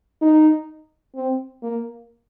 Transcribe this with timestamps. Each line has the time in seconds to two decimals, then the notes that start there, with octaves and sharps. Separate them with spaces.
0.22 D#4
1.16 C4
1.63 A#3